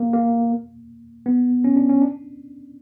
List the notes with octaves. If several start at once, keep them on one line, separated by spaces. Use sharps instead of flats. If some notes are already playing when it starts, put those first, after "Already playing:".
Already playing: A#3
A#3
B3
C#4
D4
C#4
D4